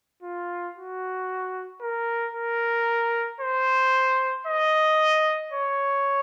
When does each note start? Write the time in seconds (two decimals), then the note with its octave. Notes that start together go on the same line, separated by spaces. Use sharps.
0.23 F4
0.75 F#4
1.81 A#4
2.34 A#4
3.41 C5
4.47 D#5
5.52 C#5